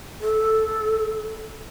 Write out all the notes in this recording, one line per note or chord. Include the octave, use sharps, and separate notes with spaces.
A4